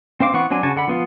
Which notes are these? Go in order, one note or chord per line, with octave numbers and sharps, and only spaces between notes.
C4 C5 F5 D6
E3 B3 C4 F#5 C#6
F#3 C4 D4 G#5
C#3 F#4 G#5 A5
D3 F#5 B5
F3 B3 F4